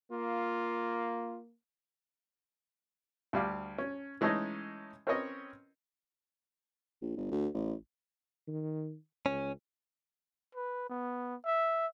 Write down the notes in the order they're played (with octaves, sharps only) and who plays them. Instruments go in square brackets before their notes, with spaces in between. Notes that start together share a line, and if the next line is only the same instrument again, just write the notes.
[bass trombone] A#3 [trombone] F4
[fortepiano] D2 G3 F5 D6
C#4
E3 G#3 A3 C#4 D#4 D#5
C4 C#4 A#4 B4 C#5 D#5
[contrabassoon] A#1
G1
D2
A1
[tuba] D#3
[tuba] C#2 [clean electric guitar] C#4
[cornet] B4
B3
E5